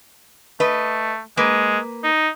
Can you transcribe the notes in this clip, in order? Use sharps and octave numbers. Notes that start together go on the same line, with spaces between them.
A3 B4 D#5
G#3 A#3 B4
D#4